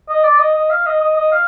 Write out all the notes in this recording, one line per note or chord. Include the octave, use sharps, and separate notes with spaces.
D#5
D5
D#5
D#5
F5
D#5
D#5
D#5
F5